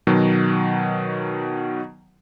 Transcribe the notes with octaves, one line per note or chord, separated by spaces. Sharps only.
B2 D#3 F#3